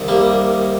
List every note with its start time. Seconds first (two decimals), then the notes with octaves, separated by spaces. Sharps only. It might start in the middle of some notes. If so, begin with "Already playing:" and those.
Already playing: C2 C3 D#3
0.08 G3 A#3